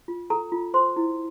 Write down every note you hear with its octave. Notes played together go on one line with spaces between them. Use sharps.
F4
A4 A#5
F4
C5 C6
E4